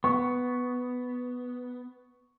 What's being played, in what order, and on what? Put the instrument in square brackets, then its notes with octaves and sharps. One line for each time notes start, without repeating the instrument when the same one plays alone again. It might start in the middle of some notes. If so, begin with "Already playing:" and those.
[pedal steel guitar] B3 [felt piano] C#6